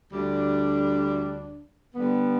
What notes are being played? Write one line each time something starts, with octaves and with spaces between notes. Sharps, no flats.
D2 D3 G3 D4
D3 G3 B3